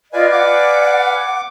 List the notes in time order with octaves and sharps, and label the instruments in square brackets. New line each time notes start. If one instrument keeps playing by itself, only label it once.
[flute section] F4 D#5 [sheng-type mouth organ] B4 F5 G#5 [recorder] D5
[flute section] F#5 [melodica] D6